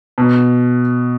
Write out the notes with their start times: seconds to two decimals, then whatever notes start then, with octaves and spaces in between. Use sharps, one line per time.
0.18 B2